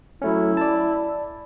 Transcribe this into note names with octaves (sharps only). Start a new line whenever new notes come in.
F#3 A3 C#4 E4
D5 A5